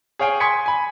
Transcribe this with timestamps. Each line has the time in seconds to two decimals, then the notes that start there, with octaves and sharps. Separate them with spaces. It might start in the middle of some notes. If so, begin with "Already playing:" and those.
0.19 G#4 C#5 F5 G5 G#5
0.40 G#5 C6 D#6 G#6 B6 C#7
0.66 G#5 B5